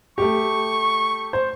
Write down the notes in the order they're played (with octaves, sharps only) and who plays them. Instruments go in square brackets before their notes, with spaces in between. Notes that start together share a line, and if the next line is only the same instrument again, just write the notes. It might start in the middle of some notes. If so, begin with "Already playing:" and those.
[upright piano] A3 G4 [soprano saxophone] C#6
[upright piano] C5